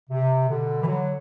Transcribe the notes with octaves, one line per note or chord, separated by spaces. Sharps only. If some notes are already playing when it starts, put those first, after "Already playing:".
C3
B2 D3
E3
D3 F#3